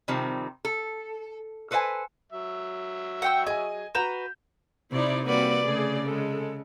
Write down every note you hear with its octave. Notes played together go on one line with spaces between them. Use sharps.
C3 D#3 F3 G3 C4
A4
A4 B4 C5 D#5 G#5 A5
F#3 E5
F#5 G5 E6
G#4 D#5 G#5
F#4 B4 A#5 G6 E7
C3 D#4 E4 D5
G3 A#3 C4 F#4 B4 D5
C#3 A3 G#4 D5
G#3 A4